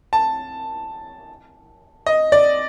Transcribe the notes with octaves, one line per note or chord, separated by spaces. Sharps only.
A5
D#5
D5